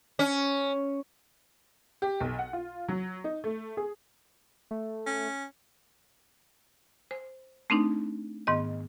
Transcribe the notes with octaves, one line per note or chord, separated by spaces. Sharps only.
C#4
G4
B1
F#5
F4
F#3
D#4
A3
G#4
A3
C#4
C5
A3 C4 D4 D#4
G#2 D#3 B3 D#5